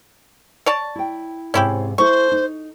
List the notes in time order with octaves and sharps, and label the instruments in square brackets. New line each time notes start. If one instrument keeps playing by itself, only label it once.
[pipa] C#5 D5 A5
[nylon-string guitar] E4 G5
[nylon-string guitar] G#2 C3 C4 [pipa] C#4 E4 G4
[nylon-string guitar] A3 E4 A4 [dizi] C5 [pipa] C#6
[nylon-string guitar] D#4